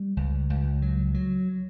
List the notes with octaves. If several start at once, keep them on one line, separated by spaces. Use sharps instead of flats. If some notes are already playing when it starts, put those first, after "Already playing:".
Already playing: G3
C#2
C#2
F#3
F#3